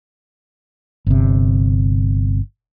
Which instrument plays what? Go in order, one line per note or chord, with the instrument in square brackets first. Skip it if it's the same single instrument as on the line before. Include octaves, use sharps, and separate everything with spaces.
[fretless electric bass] G1 C3